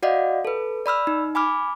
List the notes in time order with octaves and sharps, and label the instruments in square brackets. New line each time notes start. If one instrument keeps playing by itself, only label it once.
[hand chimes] F#4 D5 D#5 F5 F#5
A4 B4
D5 B5 E6 F6
D#4
G#5 B5 D6 F6